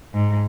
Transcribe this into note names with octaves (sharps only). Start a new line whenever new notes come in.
G#2